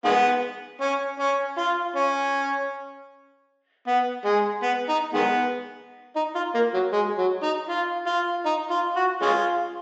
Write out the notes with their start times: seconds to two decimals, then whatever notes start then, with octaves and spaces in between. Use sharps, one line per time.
0.05 D#3 G#3 B3
0.81 C#4
1.20 C#4
1.58 F4
1.96 C#4
3.87 B3
4.25 G#3
4.63 B3
4.89 D#4
5.14 D#3 G#3 B3
6.16 D#4
6.36 F4
6.54 A#3
6.74 F#3
6.93 G#3
7.18 F#3
7.43 D#4
7.69 F4
8.07 F4
8.46 D#4
8.71 F4
8.96 F#4
9.22 G#3 C#4 F4